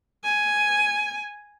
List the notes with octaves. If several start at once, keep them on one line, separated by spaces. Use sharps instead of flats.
G#5